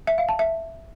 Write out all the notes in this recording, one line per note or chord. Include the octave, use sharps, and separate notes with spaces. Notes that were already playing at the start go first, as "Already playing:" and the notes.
E5
F5
A5
E5